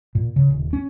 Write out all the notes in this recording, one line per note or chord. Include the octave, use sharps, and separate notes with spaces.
A#2
C#3
D#1
C#4